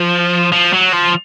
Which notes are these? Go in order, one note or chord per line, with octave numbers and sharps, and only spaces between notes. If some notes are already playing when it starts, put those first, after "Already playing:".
Already playing: F3
F3
F#3
F3